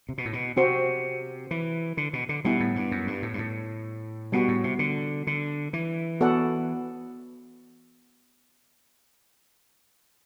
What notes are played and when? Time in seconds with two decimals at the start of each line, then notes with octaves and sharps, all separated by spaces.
0.09 C3
0.18 B2
0.25 A2
0.33 B2
0.57 C3 C4 F#4 C5
1.51 E3
1.97 D3
2.13 B2
2.29 D3
2.45 B2 G3 B3 E4
2.60 A2
2.76 G2
2.91 F#2
3.07 G2
3.22 A2
3.34 G2
3.39 A2
4.32 B2 G3 B3 F#4
4.48 A2
4.64 C3
4.79 D3
5.27 D3
5.73 E3
6.21 B3 F#4 A4 D5 F#5